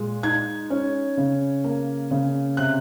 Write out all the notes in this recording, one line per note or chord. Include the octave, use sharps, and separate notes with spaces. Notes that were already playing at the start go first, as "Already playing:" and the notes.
Already playing: A#2 G#3
D#4 G#6
C#4
C#3
A#3
C#3
C3 F#6